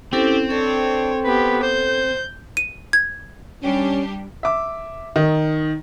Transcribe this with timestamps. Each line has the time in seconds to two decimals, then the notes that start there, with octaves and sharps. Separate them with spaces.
0.13 C4 C#4 E4 G4 A4
0.51 D4 A4 C#5
1.25 B3 G4 B4
1.63 C5 G6
2.57 D#7
2.93 G#6
3.63 G3 C#4 D4 G4
4.43 E5 D6
5.16 D#3